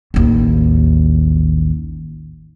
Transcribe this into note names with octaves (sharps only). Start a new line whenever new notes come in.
A1 D#2